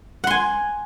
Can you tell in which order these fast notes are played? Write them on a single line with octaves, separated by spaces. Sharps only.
F#5 C6 G#5